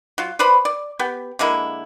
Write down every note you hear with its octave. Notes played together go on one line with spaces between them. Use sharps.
F#3 F4
B4 C5 D5 B5
D5
B3 G4
D3 G#3 A#3 E4